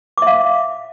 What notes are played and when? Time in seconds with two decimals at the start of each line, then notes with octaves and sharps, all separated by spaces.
0.18 D6
0.22 E5
0.27 F5